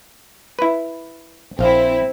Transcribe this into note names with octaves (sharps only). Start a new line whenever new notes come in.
E4 B4
A#1 C4 E4 F5